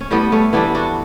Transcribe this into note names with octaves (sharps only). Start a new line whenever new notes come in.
C#4
A2 G3 B3
A3 C#4
E3 G3 B3 D4
D4 F#4